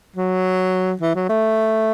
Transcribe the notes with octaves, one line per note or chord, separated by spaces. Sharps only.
F#3
E3
F#3
A3